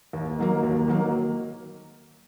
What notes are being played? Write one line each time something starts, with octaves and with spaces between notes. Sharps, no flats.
D#2
D#3 F#3 A#3
D#2
D#3 F#3 A#3